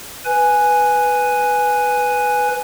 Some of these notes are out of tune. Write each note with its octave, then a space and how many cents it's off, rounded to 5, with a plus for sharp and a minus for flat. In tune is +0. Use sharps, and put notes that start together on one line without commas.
B4 +0 G#5 +0